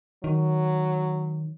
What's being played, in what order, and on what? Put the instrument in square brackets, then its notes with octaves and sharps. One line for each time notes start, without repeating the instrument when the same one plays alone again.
[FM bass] D#3 [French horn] F#3